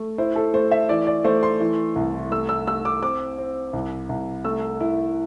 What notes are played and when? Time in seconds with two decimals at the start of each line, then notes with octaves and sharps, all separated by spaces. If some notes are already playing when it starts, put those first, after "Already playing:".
Already playing: A3
0.18 E4 C5
0.36 A4
0.54 A3 C5
0.71 E5
0.89 E3 D5
1.07 D5
1.24 A3 C5
1.43 C6
1.60 E3
1.96 C2
2.31 A3 E6
2.49 E6
2.67 A3 E6
2.85 D6
3.03 C4 D6
3.38 C4
3.73 C2
4.09 C2
4.45 A3 E6
4.80 E4